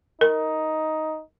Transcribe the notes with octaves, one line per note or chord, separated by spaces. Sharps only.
D#4 A#4